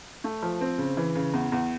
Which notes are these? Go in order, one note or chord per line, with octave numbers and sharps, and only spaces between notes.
A3
F3
C4
C#3
E3
C#3
E2
E2